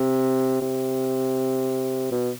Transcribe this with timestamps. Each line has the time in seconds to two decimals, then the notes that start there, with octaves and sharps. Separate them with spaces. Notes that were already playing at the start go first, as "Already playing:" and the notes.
Already playing: C3
0.62 C3
2.11 B2